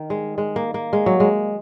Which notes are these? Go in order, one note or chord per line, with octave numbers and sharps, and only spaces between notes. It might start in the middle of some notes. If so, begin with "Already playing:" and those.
Already playing: D#3
G#3
G#3
A#3
A#3
G#3
F#3
G#3